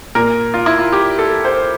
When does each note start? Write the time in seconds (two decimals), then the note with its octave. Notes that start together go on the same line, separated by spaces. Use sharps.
0.15 A#2 A#4
0.54 F4
0.66 E4
0.79 F4
0.92 G4
1.19 A4
1.45 C5